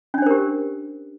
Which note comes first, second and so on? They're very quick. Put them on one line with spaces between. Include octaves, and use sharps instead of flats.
C#4 D4 C5 A#4 G4